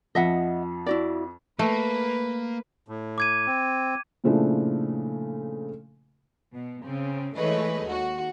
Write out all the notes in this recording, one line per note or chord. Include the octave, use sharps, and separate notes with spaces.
F2 F3 D#5 E5 F#5
E4 F#4 D5
A3 A#3 B4
A2
D6 G#6 D#7
C4
A#2 C#3 F3 A3 D4 E4
B2
C#3 C4
E3 G#3 A3 B4 C#5 D#5
D#2 F#4